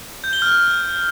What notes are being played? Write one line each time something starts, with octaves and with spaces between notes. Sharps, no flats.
G6
G7
F6